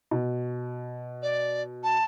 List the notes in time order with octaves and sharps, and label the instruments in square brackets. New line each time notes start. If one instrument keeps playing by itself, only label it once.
[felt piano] B2
[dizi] D5
A5